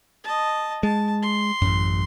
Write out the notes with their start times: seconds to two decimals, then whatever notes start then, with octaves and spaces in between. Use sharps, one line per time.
0.24 D#5 A5
0.83 G#3 A5
1.22 C6
1.62 A1 F#2